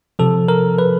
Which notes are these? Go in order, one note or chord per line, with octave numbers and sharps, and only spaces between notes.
C3 F3 A4
A#4
B4